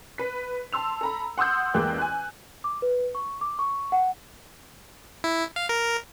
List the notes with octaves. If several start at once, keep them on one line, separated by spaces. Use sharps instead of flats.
B4 B6
A5 C6 E6 F7
A4 A#5 B5
F#5 C6 D#6 E6 G6
A1 E2 G#3 A#3 G5 F#6
G#5 F#6
D6
B4
C#6
D6
C#6
F#5
E4
F5
A#4